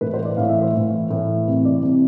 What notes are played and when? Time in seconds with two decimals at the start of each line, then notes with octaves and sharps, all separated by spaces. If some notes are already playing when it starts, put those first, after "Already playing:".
0.01 A2 E3 B4
0.14 C5
0.25 D5
0.37 A2 E3 F5
0.49 E5
0.62 C5
0.75 A2 E3
1.10 A2 E3
1.48 C3 E3
1.65 D5
1.83 C3 E3